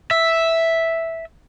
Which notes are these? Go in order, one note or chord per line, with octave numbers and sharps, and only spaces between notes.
E5